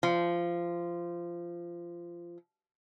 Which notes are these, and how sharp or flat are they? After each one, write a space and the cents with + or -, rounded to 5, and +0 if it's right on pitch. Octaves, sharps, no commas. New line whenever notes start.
F3 -20